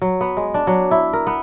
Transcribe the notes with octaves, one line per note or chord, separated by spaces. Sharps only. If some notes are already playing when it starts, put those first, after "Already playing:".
F#3
B3
G#3
D4
F#3
E4
A#4
B3